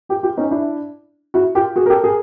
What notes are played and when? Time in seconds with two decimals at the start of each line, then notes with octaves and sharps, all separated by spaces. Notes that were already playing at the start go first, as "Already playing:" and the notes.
0.09 F4 G4
0.23 F4 G4
0.37 C#4 D#4
0.51 D4 E4
1.34 E4 F#4
1.55 F4 G4
1.76 F#4 G#4
1.86 A#4
1.90 G4 A4
2.04 G#4 A#4